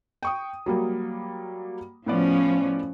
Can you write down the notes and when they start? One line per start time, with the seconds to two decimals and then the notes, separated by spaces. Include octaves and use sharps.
0.23 G5 C#6 D#6
0.66 F#3 G3 A#3
2.06 A2 F3 B3 C#4 D5